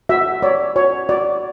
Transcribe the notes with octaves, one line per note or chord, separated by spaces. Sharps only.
F#4 E5
C#5 D5
F#4 C#5
F#4 D5